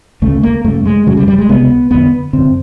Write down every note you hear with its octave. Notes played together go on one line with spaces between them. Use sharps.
D2 C#3 A3
A#3
F#2 C#3 A3
G#3
F#2 C#3 F#3
G3
G3
G#3
C#2 C3 B3
F2 D3 B3
F#2 D3 C4